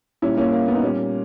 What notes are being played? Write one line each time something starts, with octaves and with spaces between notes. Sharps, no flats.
A#2 G3 C#4 E4
A#3 C#4
A#3
B3
D#4
A#2 G3 A#3 C#4